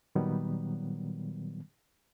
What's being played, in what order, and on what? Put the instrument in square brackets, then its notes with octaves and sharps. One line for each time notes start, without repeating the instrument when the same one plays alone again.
[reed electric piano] A#2 D#3 F#3 G3 B3